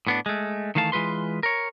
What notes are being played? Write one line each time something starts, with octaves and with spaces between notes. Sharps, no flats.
A2 B3 D4
G#3 A3
D#3 E3 A3 F5 A5
E3 G#3 F4 B4 C6
A#4 C#5